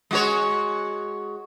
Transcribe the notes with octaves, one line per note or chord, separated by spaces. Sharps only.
G#3 F#4 C#5